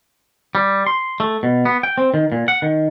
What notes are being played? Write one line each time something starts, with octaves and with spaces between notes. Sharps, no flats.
G3
C6
A3
B2
B3
G5
C4
D#3
A#2
F#5
D#3